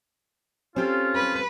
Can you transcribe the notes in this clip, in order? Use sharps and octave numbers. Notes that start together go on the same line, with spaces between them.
C4 C#4 F4 G4 A4
B4